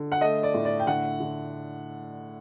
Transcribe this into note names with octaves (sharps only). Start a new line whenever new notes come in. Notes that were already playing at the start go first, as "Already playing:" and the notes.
Already playing: D3
F#5
A3 D#5
D5
A2
D5
G5
D3 F#5
D3